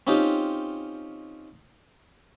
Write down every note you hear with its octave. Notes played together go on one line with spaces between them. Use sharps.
C4 C#4 D#4 F4 G4